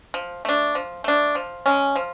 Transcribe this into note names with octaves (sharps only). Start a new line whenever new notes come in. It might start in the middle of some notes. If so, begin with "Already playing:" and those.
F3
A3 D4
F3
A3 D4
F3
G#3 C#4
F3